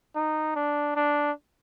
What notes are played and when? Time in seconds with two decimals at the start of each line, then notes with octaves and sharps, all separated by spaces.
0.16 D#4
0.56 D4
0.96 D4